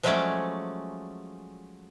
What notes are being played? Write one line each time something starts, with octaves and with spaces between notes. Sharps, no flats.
F3 F#3 G#3 A3 C#4 D5